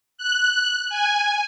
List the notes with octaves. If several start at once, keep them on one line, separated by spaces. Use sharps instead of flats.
F#6
G#5